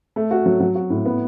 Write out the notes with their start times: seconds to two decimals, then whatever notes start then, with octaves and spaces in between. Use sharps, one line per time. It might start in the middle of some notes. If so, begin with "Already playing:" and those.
0.16 A3
0.31 F#4
0.46 F#3
0.60 F#3
0.75 F#4
0.90 A2
1.05 B3